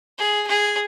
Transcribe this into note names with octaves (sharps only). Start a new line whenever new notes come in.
G#4
G#4